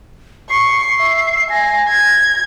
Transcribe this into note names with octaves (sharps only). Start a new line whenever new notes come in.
C#6 C7
E5
G#5 A#6
G#6